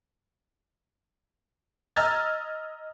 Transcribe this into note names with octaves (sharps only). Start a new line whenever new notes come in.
D#5 A#5 E6 F6 G#6 A6